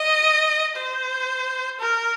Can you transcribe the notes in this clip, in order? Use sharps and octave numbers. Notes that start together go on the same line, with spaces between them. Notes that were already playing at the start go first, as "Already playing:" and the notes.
Already playing: D#5
C5
A#4